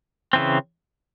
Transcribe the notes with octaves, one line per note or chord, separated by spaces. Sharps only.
C#3 E3 C4